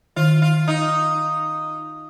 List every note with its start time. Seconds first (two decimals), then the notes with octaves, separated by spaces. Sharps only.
0.16 D#3 F4
0.42 F4
0.68 D#4